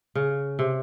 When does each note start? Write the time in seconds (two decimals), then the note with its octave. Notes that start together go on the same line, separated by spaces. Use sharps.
0.15 C#3
0.59 C3